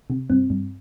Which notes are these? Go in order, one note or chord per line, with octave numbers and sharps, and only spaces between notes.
C3
G2 C4
G2